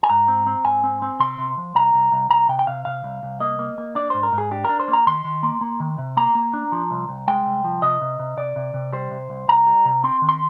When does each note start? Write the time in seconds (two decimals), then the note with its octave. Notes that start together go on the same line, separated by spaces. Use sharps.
0.03 G#5
0.10 G#2 A#5
0.28 C4
0.47 C4
0.64 G#2 G#5
0.84 C4
1.02 C4
1.20 C3 C6
1.38 C3
1.57 F3
1.75 C2 A#5
1.94 C2
2.12 C2
2.30 C2 A#5
2.49 C3 G5
2.59 G5
2.67 C3 F5
2.85 C3 F5
3.04 C2
3.23 C2
3.40 A#3 D#5
3.59 A#3
3.78 A#3
3.95 D4 D5
4.10 G#2 C5
4.23 A#4
4.33 G#2
4.38 G#4
4.51 D4 G4
4.64 D4 A#4
4.79 C5
4.88 A#3
4.93 A#5
5.07 D#3 C6
5.24 D#3
5.43 A#3
5.61 A#3
5.80 D#3
5.98 C3
6.17 A#3 A#5
6.35 A#3
6.54 D4
6.72 F3
6.91 C2
7.09 C2
7.28 G#3 G5
7.46 C2
7.64 F3
7.82 C3 D#5
8.02 C3
8.19 C3
8.37 C3 D5
8.56 C3
8.74 C3
8.93 G3 C5
9.11 C3
9.30 C2
9.48 C2 A#5
9.67 G3
9.85 C3
10.04 C4 C6
10.22 D#3
10.29 C6